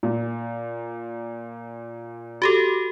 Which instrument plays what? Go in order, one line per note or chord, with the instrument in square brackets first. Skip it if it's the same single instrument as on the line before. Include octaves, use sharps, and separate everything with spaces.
[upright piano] A#2
[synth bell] F#4 G4 A4